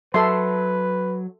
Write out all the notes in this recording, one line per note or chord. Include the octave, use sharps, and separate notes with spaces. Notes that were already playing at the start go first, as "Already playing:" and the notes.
F#3 A4 B4 E5 C6